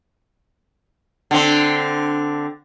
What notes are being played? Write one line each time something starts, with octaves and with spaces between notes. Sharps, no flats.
D3 C4